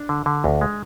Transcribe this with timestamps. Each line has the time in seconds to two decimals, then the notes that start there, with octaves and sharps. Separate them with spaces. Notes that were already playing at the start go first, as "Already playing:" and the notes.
Already playing: D4
0.09 D3
0.26 D3
0.44 D2
0.61 G#3